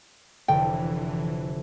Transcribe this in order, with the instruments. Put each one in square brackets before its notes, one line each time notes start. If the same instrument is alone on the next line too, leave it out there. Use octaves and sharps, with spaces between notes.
[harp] F1 D3 [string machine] E3 [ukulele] G5